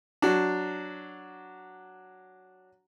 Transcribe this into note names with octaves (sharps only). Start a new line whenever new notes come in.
F#3 D4